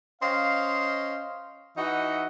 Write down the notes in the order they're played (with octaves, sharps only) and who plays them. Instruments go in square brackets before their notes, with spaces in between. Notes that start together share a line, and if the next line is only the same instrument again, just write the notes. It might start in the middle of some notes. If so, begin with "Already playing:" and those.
[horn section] C#4 C5 D#5 F5
E3 D#4 F#4 D#5 E5 F#5